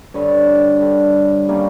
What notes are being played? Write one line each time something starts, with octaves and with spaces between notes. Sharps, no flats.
G2 D3 G3 B4 C#5
G2 D3 G3
D#3 G3 A#3 C#4